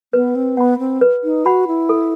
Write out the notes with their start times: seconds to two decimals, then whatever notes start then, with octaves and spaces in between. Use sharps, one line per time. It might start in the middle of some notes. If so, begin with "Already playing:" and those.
0.13 B3 B4
0.35 C4
0.57 B3 F#5 B5
0.79 C4
1.01 B4
1.24 D#4
1.45 F#4 F#5 B5
1.67 E4
1.89 A4